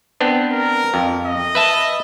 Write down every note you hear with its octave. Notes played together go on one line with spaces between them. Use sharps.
B3 C4 D4
A#4
F2
D#5
B4 E5 A5